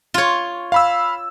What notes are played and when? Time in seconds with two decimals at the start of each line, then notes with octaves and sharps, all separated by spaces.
0.14 F4 C#5
0.72 F5 B5 E6